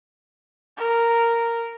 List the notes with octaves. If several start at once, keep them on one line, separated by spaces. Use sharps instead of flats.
A#4